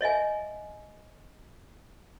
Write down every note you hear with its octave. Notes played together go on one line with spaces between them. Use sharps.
C#5 D#5 E5 G#5